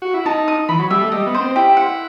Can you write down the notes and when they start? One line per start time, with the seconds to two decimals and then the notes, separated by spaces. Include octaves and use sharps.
0.02 F#4
0.14 E4
0.25 D#4 A5
0.48 D#6
0.69 E3 B5
0.79 F#3
0.90 G3 E5
1.01 A3
1.12 G3 D#5
1.26 B3
1.35 C5
1.41 C4
1.56 E4 G4
1.77 F#5